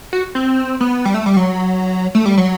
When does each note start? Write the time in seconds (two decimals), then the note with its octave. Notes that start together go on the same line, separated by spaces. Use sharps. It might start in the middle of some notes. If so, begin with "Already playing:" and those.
0.13 F#4
0.35 C4
0.80 B3
1.05 G3
1.14 A3
1.26 G3
1.36 F#3
2.15 A3
2.25 G3
2.37 F#3